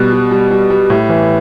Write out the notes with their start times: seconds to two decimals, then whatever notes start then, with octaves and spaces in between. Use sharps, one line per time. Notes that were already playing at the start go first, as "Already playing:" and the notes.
Already playing: B2 G3 F#6
0.12 G3
0.31 G3
0.51 G3
0.70 G3
0.90 A2
1.09 E3